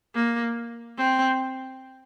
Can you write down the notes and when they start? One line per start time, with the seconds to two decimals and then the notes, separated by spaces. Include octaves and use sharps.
0.15 A#3
0.98 C4